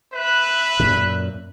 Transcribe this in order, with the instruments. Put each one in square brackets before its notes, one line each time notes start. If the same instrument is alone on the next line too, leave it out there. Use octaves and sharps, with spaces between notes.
[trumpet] B4 [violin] E5 F#6
[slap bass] F#2 A#2